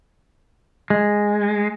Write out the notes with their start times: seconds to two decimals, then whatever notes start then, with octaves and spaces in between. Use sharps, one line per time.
0.90 G#3